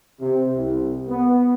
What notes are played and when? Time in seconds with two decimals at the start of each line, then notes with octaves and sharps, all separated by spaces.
0.20 C3
0.55 C2
1.08 B3